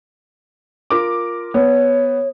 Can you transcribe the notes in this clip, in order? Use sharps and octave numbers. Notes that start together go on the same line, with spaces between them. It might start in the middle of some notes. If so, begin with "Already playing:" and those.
F4 A#4 D6
B3 C#5